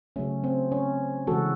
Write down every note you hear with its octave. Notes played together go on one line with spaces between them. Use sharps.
C#3 F#3 A3 C#4
C4
C#4
C#3 E3 G#3 F#4 A4